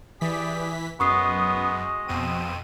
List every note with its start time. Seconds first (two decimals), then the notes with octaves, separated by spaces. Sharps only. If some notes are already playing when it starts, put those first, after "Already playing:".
0.21 E3 G4 G#4 D5 B6
1.00 F#2 G#3 B3 F#4 D#5 C#6 D#6 C7
2.08 F2 B2 C4 D#7